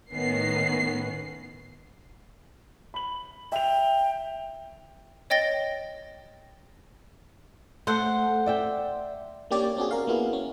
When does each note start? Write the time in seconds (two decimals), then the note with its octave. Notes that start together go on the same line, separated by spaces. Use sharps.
0.14 A2 D#3 B3 C#4 C7
2.94 B5 F#7
3.52 E5 G5 F7
5.30 C#5 D#5 G5 A6 A#6 G7
7.87 A3 C5 F#5
8.46 D5 E5 G5
9.51 A#3 C#4 D4 G4 C#5 D5
9.77 C4 D4 F#4 G#4
9.91 C#4 A#4 F5
10.07 A#3 B3 E4 F#4 G#4
10.33 C#4